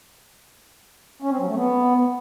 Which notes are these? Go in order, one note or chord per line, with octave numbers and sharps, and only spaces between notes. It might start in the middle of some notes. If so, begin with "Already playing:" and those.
C#4
C4
F#3
A3
B3